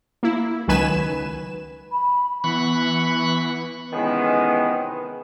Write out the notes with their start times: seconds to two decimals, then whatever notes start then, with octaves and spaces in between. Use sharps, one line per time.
0.23 A#3 E4
0.68 C#2 D#3 F#3 B4 G#5 E7
1.92 B5
2.44 E3 B3 B5 C#6 F#6
3.93 C3 D#3 E3 G#3 B3 C#4